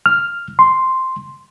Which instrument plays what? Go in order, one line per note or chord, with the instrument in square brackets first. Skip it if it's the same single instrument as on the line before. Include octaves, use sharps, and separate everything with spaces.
[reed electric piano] F6
C6